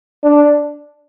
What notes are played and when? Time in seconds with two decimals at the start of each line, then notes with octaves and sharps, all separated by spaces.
0.24 D4